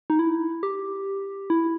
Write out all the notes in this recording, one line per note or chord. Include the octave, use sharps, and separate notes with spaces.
D#4
E4
G4
E4